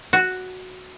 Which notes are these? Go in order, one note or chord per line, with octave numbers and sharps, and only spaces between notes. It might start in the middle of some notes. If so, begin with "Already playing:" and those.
F#4